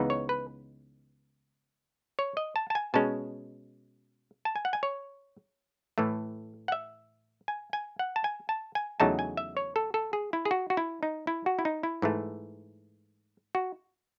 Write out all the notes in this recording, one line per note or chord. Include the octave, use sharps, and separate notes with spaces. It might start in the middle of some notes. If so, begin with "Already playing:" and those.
Already playing: C#2 C#3 E3 B3 D#4
C#5
B4
C#5
D#5
A5
A5
G#5
B2 G#3 C#4 A5
A5
G#5
F#5
G#5
C#5
A2 E3 A3
F#5
E5
G#5
G#5
F#5
A5
G#5
A5
G#5
E2 C#3 F#3 A3 D#4 A5
G#5
E5
C#5
A4
A4
G#4
E4
G#4
F#4
F#4
E4
D#4
E4
F#4
E4
D#4
E4
G#2 E3 A3
F#4